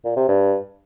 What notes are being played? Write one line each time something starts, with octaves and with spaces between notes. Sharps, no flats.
A#2
C3
G2